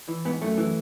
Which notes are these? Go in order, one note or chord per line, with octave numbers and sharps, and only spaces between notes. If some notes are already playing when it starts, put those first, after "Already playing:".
E3
G#2 B3
F#2 A3
E3